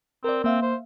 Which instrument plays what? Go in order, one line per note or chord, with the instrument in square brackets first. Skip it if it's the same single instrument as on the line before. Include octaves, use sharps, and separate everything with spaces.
[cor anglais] C4 [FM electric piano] A#4 D5
[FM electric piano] A#3 E5 F5 [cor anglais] C4
[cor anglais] C5